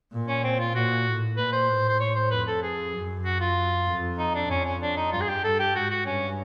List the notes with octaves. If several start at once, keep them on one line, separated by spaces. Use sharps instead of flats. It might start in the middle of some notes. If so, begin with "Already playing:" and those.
A#2
C#4
C4
F4
A#2 F#4
A2
A#2 B4
C5
A2
C5
C#5
C5
F2 B4
A4
G#4
F#2
F#4
F4
F2
D#4
D4
F2 C#4
C#4
D4
D#4
G2 F4
G#4
G4
G2 A4
G4
G#2 F#4
F#4
G2 C#4